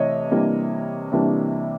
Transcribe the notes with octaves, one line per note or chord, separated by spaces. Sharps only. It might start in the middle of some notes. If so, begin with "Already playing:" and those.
Already playing: C3 E3 A3 C#5 D#5
C3 E3 G3 A#3 D4
C3 E3 G3 A#3 D4